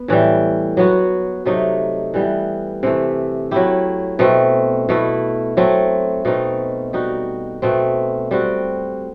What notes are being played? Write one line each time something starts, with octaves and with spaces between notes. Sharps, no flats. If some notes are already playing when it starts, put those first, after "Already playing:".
Already playing: B3
A2 E3 G3
F#3 B3 F#4
C3 F#3 A3 D#4
E3 G3 B3
C3 E3 A3
F#3 A3 E4 G4
B2 A3 C4
B2 A3 E4
F#3 A3 C4
B2 A3 C4 D#4
G3 D#4 F#4
B2 A3 C4
G3 C4 F#4